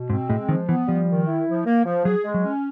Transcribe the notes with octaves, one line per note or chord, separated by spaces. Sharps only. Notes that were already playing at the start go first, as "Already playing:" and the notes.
Already playing: B2
G#2 C4
A2 G#3
D#3 F3
E3 B3
F3 G3
D#3
E4
F3
A#3
F3
F#3 G#4
G#3
F#3
C#4